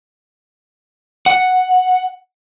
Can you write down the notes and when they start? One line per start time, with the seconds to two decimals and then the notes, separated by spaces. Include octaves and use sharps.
1.26 F#5